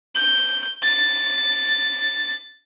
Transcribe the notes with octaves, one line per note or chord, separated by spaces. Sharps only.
G6
A6